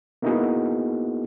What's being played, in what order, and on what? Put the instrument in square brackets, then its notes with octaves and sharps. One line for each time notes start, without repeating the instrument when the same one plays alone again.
[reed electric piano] A#3 B3 D#4 E4 F#4 G#4